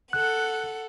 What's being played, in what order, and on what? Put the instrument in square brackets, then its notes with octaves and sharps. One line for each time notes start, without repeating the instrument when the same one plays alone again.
[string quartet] A4 F#5 [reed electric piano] F#6